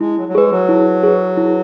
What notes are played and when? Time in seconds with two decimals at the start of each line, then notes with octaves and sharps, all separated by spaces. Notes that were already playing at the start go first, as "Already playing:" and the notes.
0.01 G#3 E4
0.18 F#3
0.29 F#3
0.35 G#3 G#4 B4
0.51 F#3
0.69 E4
1.03 G#4 B4
1.37 E4